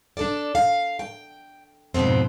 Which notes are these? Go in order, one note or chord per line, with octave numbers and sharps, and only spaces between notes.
D4 A4 D5
F5
G5
F2 G#2 B2 B3 C4